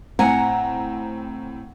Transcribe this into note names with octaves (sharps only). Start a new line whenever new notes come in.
A2 C4 F#5 G#5 A#5